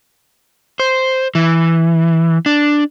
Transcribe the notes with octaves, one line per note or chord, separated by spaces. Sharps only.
C5
E3
D4